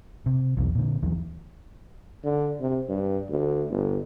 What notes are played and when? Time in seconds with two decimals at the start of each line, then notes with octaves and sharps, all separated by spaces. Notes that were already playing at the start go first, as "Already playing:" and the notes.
0.26 C3
0.57 B1 E2 B2
0.75 A#2 D3
1.03 D#2 E3 F#3
2.24 D3
2.60 C3
2.89 G2
3.29 D2
3.69 G1